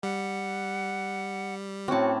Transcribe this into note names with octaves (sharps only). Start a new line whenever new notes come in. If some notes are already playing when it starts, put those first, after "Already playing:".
G3 F#5
A2 C4 C#4 F#4 A5 D6